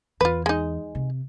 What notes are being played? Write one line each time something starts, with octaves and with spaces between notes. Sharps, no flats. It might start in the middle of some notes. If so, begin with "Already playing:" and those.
E2 F4 B4
G#3 D#4
C3